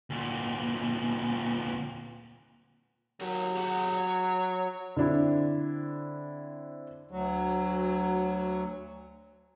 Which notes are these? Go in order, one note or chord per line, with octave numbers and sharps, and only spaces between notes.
D2 A#2
F#3 G4 A#4
G4 G#4 F#5
C#5
D3 C4 D4 E4
D2 F#3